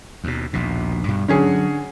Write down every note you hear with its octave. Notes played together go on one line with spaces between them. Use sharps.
D#2 B2
A#1 D#2 B2
G2 B2
D3 F#3 C#4 G#4